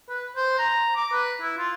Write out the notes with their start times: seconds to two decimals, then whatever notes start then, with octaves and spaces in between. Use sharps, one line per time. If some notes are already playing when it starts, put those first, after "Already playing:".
0.09 B4
0.36 C5
0.58 A#5
0.96 D6
1.12 B4
1.42 E4
1.58 F4